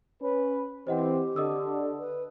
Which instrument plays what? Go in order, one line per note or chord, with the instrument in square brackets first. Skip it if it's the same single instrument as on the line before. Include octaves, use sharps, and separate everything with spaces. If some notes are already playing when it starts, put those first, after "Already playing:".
[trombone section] C#4 B4
[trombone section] E3 C4 [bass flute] G4 [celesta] C5 D#5 F#5
[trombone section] D3 [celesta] D#5 D#6 E6
[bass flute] B4